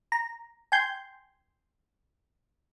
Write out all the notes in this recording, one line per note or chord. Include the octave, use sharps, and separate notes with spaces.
A#5
G5 G#5 C6 G6